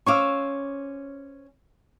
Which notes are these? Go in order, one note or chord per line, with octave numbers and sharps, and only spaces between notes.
C#4 C5 F5 C#6 D6 E6